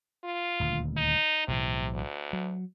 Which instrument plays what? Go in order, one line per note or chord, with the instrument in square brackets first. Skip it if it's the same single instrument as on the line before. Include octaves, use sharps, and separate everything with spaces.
[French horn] F4
[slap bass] D#1 D2
[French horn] D#4
[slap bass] B1 A2 E3 [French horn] C3
[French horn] D2
[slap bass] F#3